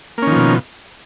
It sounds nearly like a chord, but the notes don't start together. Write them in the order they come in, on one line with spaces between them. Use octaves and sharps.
A#3 C#4 D#3 F3 B2